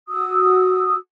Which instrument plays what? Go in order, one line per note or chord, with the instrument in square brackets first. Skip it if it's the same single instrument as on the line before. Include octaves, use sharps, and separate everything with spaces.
[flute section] F#4 D#6 E6